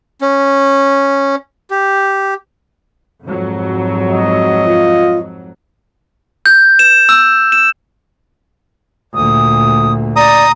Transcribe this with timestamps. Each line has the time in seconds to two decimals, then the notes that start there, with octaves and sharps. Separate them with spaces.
0.21 C#4
1.70 G4
3.25 F2 G#2 F#3
4.09 D#5
4.65 F4
6.46 G6
6.79 E7
7.09 E6
7.52 E7
9.15 D2 A#2 D#6
10.16 D5 A#5 D#6